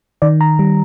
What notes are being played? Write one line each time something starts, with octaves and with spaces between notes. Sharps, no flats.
D#3 D5
A#5
G3